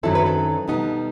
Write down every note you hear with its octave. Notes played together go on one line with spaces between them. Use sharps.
F#2 D#3 F#3 C4 E4 A4
B4
A4
B2 G3 B3 D#4